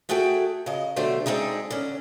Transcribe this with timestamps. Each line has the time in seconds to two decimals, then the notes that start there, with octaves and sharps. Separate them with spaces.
0.09 A3 F#4 G#4 A4 G5
0.66 C#3 D#5
0.96 B2 D3 F#3 A3 G4 C5
1.26 G#3 C4 D4 D#4 G#4
1.71 D3 C#4